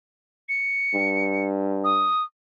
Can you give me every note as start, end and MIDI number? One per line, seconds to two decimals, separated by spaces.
0.49 1.45 97
0.94 2.10 43
1.84 2.23 87